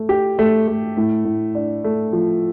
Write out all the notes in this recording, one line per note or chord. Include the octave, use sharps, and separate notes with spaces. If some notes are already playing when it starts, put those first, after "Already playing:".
Already playing: A3
G4
A3
A3
A2
A2
D4
A3
F3